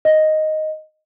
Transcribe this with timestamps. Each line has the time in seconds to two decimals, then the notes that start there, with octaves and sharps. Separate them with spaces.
0.05 D#5